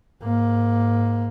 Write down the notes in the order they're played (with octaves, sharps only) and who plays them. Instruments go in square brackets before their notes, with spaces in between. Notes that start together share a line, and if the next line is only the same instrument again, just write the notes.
[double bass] G#2 A#3